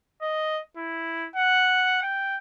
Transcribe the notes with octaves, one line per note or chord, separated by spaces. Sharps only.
D#5
E4
F#5
G5